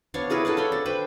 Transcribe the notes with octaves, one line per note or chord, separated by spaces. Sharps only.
B3 D4 C#5 F5
E4 G#4 A#4 B4
A4 B4 F5 F#5
D4 C#5 G5 B5
D4
B4 C5 G5 B5